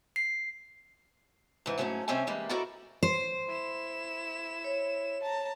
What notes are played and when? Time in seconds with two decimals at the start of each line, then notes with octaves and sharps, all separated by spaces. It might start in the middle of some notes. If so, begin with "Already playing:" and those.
0.16 C7
1.66 G#2 E3
1.78 G#2 F#3 A3 A#3 C4 C#4
2.08 C3 G3 C4 C#4 E5 G#5
2.27 E3 G3 G#3 A#3
2.49 D#4 E4 F#4 A4 A#4 D5
3.03 C5
3.48 E4 E7
4.64 C#5
5.23 A5 A#5